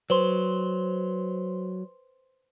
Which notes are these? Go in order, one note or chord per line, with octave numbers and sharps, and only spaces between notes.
F#3 B4 C5 C6